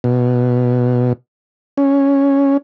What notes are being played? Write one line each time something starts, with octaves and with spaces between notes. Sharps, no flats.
B2
C#4